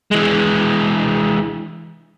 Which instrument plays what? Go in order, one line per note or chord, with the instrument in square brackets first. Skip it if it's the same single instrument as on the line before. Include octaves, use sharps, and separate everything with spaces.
[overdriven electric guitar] E3 G#3